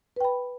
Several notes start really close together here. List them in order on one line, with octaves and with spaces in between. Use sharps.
B4 G5 B5